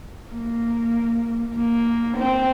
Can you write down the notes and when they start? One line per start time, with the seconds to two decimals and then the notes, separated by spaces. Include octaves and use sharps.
0.31 A#3
1.55 A#3
2.17 C4